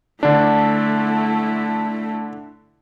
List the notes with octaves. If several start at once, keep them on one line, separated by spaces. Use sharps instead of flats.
D3 A3 D4 E4